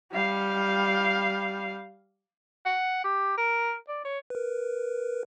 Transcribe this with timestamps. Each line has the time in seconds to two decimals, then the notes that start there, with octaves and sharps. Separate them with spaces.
0.12 G3 F5
2.65 F#5
3.04 G4
3.38 A#4
3.89 D5
4.05 C#5
4.30 A#4 B4